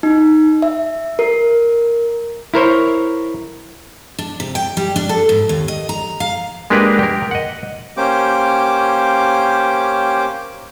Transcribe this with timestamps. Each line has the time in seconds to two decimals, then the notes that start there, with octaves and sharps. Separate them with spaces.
0.03 D#4
0.62 E5
1.19 A#4
2.54 E4 A#4 C5 C#5
4.19 D4
4.40 C3
4.55 G5
4.77 G3
4.96 D4
5.09 A4
5.29 G#2
5.49 D#2
5.68 D#5
5.89 A#5
6.20 F5
6.70 G#3 A#3 D4 G4 A#4 B4
6.99 G4 A#4
7.31 D#5 F#5
7.97 A#3 C#4 G4 C5 D6